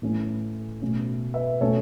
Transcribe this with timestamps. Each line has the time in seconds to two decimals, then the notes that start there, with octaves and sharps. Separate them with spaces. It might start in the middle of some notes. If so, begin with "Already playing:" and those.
0.02 A2 E3 A3 C#4
0.82 B2 A3 C#4
1.34 B4 E5
1.61 B2 A3 C#4 A4 C#5